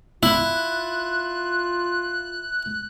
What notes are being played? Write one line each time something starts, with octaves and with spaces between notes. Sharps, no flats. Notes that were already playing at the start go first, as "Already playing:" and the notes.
E4 F4 F#6